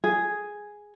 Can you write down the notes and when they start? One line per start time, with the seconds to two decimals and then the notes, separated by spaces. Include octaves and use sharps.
0.04 G#4